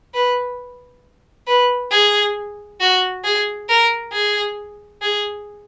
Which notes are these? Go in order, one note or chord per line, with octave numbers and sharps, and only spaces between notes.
B4
B4
G#4
F#4
G#4
A#4
G#4
G#4